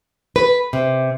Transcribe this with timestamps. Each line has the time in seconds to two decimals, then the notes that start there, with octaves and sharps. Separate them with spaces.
0.36 B4
0.73 C3